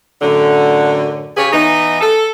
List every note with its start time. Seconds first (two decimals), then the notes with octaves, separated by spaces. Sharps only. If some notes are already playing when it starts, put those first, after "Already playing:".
0.22 F#2 A2 D3
1.37 C#3 G4 G#4 B4 C#5
1.53 E3 B3 D#4
2.01 A4